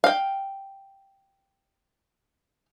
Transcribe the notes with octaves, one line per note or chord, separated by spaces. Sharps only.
F5 G5